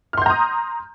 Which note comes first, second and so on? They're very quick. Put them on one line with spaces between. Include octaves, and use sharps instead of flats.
F6 C6 G6 A#5 D#6